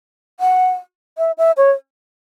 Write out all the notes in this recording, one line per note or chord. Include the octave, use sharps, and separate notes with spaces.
F#5
E5
E5
C#5